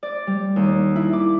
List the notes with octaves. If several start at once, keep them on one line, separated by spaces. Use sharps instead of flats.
D5
G3
D#2
E4
D6